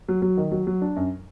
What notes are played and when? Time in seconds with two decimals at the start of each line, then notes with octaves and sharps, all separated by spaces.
0.08 F#3
0.22 F#3
0.37 D#3
0.52 F#3
0.67 F#3
0.82 D4
0.96 F#2